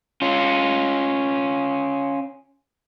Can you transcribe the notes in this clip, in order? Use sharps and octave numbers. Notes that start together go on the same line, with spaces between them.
C#4 F4